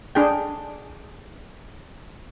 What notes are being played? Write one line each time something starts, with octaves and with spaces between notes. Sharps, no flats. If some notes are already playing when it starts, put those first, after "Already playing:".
D4 G#4 G5